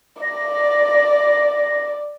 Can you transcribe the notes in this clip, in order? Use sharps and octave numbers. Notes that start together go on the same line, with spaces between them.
D5 A#6